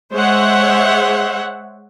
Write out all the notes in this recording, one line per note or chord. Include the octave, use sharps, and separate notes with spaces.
G#3 C5 C#5 E5 F#5